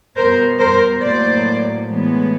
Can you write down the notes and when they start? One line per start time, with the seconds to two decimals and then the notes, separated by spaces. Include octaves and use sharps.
0.17 B2 G3 B3 A#4 C5
0.59 A#4 C5
1.01 A2 F#3 A#3 C5 D5
1.85 A2 E3 G#3 B3